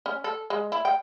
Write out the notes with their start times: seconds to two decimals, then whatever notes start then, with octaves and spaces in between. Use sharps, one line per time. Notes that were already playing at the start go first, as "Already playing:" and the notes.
0.06 C#4
0.24 A4
0.50 G#3
0.72 E4
0.85 G5